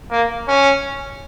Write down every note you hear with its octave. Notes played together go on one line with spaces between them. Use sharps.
A#3
C#4